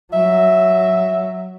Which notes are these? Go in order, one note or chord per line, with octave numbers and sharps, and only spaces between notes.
F#3 E5